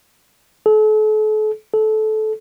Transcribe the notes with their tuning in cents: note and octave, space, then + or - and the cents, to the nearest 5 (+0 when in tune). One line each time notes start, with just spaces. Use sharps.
A4 -40
A4 -20